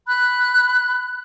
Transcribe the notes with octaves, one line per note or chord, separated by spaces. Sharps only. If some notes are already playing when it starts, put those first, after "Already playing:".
B5 F#6